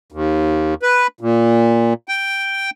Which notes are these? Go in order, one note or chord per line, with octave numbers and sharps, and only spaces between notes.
D#2
B4
A#2
G5